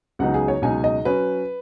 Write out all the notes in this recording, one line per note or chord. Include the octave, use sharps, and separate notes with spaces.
C#2 C#3 F#3 B3 D#4 F#5
G#4
C#5
C#2 B2 F#3 D#4 G#5
D#5
F#3 C#4 B4